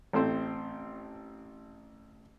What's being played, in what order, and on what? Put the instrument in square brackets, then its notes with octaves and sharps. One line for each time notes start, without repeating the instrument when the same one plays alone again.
[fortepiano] A1 A3 C4 C5